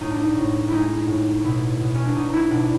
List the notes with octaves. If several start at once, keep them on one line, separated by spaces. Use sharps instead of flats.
A2 D#4
D4
D#4
A2
G#3 D#4 E4
A2
B2 E4
B2
C#4
D4
B2 D#4
D#4 E4
B2 D4